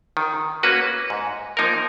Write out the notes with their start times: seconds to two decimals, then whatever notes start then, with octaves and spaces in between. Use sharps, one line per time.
0.17 D#3
0.63 A#3 C#4 F#4 B4
1.10 G#2
1.57 F3 A#3 D#4 A#4